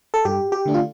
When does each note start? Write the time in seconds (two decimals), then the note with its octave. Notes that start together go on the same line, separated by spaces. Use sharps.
0.14 A4
0.25 G2 G4
0.52 G4
0.65 D3 A3 D4
0.74 F4